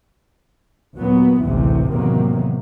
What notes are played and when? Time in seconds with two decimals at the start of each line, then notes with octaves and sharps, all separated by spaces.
0.96 D#2 A#2 F#3 B3
1.42 A1 D2 G#2 C3 E3
1.92 E2 A2 C3 D#3 F#3 A#3